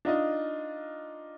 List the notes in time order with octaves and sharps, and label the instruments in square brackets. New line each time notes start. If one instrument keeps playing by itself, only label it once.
[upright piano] D4 D#4 F4 D#5